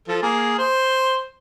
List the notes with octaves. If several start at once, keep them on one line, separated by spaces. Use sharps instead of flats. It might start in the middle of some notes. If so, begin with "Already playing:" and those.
F3 A4
A#3 G#4
C5